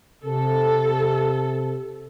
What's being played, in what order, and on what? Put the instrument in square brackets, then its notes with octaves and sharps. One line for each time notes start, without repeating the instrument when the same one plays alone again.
[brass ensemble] C3 [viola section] A4